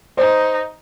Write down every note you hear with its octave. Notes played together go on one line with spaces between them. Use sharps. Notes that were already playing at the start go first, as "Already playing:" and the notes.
D#4 C5